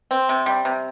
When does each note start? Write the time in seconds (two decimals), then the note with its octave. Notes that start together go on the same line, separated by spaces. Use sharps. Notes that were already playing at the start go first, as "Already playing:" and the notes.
0.11 C4
0.29 C3
0.46 G3
0.65 C3